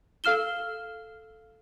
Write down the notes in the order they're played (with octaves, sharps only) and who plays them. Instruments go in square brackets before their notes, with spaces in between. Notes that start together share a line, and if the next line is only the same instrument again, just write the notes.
[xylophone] A4 F5 F6 E7 G7